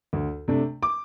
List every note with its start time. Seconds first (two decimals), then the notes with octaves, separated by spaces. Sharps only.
0.13 D2
0.48 C3 A3 D4
0.83 D6